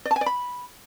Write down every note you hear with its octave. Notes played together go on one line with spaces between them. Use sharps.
D5
A5
G#5
D5
B5